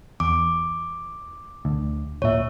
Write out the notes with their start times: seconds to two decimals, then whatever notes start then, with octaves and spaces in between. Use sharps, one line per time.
0.20 E2 D6
1.65 D2
2.22 D1 A#2 C#5 E5